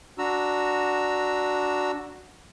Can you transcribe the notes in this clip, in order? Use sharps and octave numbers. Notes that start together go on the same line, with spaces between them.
D4 F#4 A#5 E6